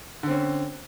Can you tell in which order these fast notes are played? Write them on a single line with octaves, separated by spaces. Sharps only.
D3 C4 C#4